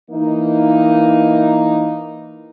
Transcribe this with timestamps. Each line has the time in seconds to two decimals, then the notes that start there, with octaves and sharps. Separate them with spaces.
0.11 E3 A#3 D#4